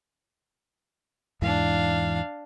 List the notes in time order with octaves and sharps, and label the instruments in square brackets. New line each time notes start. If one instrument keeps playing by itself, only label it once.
[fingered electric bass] E2 G#2 E3 [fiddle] D4 F5